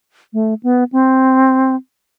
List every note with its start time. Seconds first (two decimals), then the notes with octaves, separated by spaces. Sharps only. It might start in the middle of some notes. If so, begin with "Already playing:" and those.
0.33 A3
0.63 B3
0.92 C4